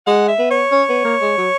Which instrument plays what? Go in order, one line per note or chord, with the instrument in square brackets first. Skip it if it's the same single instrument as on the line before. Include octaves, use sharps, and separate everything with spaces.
[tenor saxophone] G#3 [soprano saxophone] F#5
[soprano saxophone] E5
[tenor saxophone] B3
[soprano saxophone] C#5
[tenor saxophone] C#4
B3
A#3
G#3
F#3